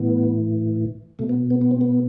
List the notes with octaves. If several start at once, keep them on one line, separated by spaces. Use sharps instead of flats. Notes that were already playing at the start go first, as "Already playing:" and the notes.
Already playing: A2 E3 B3
B2 A3
B3
B3
B3
C4
B3